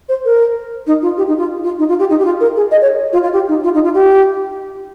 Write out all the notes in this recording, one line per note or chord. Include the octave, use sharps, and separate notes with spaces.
C5
A#4
D#4
F4
G4
D#4
F4
F4
D#4
F4
G4
D#4
G4
F4
A#4
G#4
D#5
C#5
F4
F4
G4
D#4
F4
D#4
F4
G4